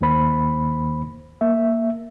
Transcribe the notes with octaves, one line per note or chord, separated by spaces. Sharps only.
D#2 D#3 A#3 C5 B5
A#3 E5